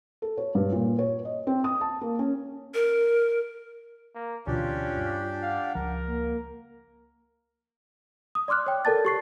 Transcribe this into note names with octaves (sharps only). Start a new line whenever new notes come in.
A4
C#5
G2
A#2
C#5
D#5
C4
D#6
A5
A#3
C#4
A#4
A#3 A#4
D2 B2 E3 C#4 D4 F4 G4 D5
G2
F5 F#5
C#2 F3 A#4
A#3
D#6
D5 C6 D6 F6 F#6
C#5 G5
A4 A#4 D5 A5 A6
G4 C#6 C7